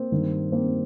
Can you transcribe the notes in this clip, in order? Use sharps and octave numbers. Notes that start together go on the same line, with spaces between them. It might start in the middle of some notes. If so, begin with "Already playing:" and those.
Already playing: A#3 C4
G2 D#3
A#3 C4